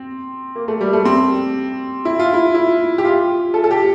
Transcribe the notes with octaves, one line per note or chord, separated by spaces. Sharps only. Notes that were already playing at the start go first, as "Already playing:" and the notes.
Already playing: C4
A#3
A3
G3
A3
C4
E4
F4
E4
E4
G4
F4
A4
A4
G4